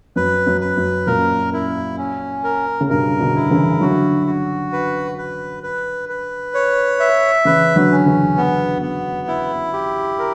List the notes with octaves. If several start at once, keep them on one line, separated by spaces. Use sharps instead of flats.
F#2 B4
F#2
B4
F#2
F#2 A#2 A#4
E4
C#4
A#4
C#3
G2 B2 A#4
B2 D3
E4
C#3 E3
D3 F#3 F#4
F#4
B4
B4
B4
B4
C#5
E5
C#3 E3 B4
D3 F#3
C#4
C#3 E3
B3
B3
E4
G4
A#4